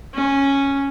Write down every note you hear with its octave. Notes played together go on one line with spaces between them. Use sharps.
C#4